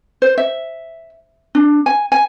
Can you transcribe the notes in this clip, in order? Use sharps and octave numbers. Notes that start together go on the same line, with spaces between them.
C5
E5
D4
G#5
G#5